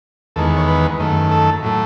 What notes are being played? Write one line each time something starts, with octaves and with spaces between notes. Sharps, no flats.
E2 D#3 G#3 B3 A4
C#5
B4
F#2 D#3 A3
A4
A2 F#3 A3